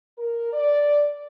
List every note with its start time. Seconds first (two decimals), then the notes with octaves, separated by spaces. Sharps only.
0.18 A#4
0.52 D5